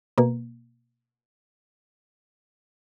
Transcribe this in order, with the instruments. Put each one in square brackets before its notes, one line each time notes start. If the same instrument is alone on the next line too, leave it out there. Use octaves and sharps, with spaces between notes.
[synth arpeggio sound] B2 A#3